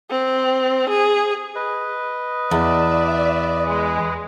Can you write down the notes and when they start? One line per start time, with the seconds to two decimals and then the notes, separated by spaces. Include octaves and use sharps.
0.10 C4
0.90 G#4
1.55 B4 D#5
2.51 E2 D5 E5
3.67 G#3